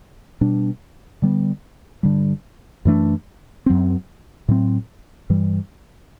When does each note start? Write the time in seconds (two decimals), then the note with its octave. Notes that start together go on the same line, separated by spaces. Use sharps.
0.41 B2 G3 D4
1.22 D3 G3 B3
2.03 G2 D3 G3
2.85 F#2 E3 A3 D4
3.66 F#2 F#3 C4
4.48 A2 F#3 C4
5.30 G2 E3 G3